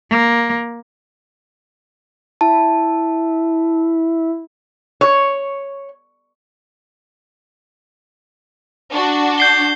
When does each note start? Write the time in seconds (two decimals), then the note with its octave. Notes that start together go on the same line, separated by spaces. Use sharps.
0.10 A#3
2.41 E4 A5
5.01 C#5
8.92 D4 F#4
9.38 G6 C7 G7